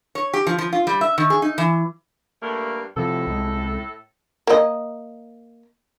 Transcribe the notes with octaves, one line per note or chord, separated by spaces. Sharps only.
C#5
G4
F3
F3
F4
G3
E5
D#3
G#4
D#4
E3
G2 A3 A#3
A2 C3 F3 A4
C2 G#3
A#3 D#5